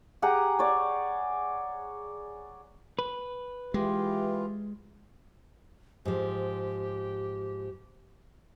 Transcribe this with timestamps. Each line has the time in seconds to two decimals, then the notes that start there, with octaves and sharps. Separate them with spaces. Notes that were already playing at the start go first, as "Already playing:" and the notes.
0.22 G4 G#4 F#5 A#5
0.59 C#5 D5 F#5
2.99 B4
3.74 E3 G#3 F4 G4
6.05 G#2 F3 G4